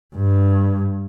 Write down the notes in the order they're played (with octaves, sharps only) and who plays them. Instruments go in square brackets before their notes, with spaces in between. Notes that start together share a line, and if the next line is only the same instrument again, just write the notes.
[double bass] G2